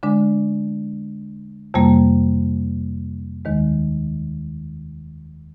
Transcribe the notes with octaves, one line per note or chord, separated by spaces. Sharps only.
D3 G#3 D4
F2 C3 G3 A#3
D#2 D#3 G#3